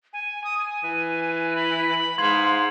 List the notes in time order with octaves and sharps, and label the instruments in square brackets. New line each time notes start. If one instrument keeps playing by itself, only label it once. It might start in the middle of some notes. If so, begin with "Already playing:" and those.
[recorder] G#5
D#6
G#5
[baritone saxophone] E3
[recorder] B5
[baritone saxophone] G#2 [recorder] F5 [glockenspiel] C6 G#6 F#7